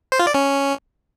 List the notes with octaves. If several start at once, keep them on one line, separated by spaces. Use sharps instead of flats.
C5
F4
D5
C#4